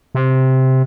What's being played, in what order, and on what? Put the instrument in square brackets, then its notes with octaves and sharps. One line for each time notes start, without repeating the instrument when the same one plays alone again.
[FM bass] C3